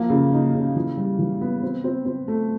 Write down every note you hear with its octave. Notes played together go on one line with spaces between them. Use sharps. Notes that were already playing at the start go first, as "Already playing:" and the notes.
Already playing: F3 A#3
C#3
D#4
C#3
E3
G3
E3
B3
C4
C4
C4
A3